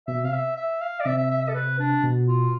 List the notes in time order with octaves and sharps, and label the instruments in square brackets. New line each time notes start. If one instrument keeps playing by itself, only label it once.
[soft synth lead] B2 [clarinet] E5
[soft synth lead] C3 [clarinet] F5
[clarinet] E5
E5
F5
D5
[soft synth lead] C3 [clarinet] E5
[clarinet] E5
E5
E5
A4
B4
D4
[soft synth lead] B2
[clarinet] F4